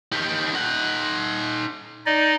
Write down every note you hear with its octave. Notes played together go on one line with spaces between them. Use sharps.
D#4 G4
D#4 F#5
D#4 D5 D#5